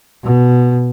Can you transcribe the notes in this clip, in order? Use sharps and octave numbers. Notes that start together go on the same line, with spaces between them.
B2